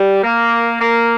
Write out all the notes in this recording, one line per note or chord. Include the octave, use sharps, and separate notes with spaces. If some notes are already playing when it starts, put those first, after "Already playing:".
Already playing: G3
A#3
A#3